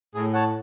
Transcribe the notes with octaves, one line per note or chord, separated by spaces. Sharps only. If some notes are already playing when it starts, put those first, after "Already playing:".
A2 G#4
C#5 F#5 A5